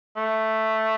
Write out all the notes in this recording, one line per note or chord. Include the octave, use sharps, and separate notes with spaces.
A3